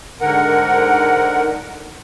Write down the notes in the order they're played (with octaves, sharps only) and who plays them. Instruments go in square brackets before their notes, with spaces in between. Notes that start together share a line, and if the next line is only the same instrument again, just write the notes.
[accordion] G#2 D3 A#4 F#5